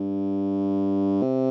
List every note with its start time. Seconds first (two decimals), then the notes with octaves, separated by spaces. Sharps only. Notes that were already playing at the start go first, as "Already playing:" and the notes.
Already playing: G2
1.22 C3